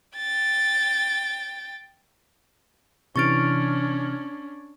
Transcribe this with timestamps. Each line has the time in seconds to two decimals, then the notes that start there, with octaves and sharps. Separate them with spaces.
0.16 G5 A6
3.16 C3 E3 C#4 D4 C#6 F6 A6 D7